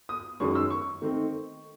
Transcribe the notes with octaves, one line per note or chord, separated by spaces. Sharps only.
D#6
F#2 D#3 G#3 C#4 C#6
E6
C#6
D#3 A3 C4 D#4